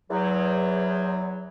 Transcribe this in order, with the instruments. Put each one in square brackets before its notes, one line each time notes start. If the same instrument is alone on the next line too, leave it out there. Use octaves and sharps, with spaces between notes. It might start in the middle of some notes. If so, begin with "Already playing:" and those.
[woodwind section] E2 F#3